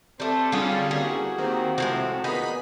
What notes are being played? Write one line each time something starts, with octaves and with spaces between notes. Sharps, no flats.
G3 A3 C4 A4
D3 G3 C#4 F4 G#4
E2 A#3 F#4 G#4
D#3 A#3 C4 G4
C2 A2 C3 F3 G#3 A#3 C4
A#2 D#3 B3 D#4 G#4 D#5 B5